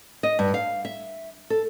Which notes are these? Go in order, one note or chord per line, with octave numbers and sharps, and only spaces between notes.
D#5
G2
F5
E5
A4